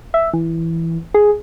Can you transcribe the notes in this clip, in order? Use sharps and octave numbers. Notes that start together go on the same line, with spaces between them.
E5
E3
G#4